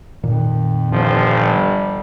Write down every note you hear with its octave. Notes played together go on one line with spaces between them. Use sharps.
F2 A#2 D#3
G1 F3
G3